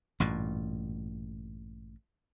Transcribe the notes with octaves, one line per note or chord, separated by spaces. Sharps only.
A1 G2 A#2